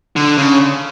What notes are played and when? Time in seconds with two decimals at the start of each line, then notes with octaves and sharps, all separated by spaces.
0.16 D3
0.38 C#3